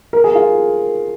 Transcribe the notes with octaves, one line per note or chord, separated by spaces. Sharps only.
A#4
G#4
F4